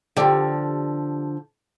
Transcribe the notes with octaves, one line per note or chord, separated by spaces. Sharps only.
D3 F3 G4 D5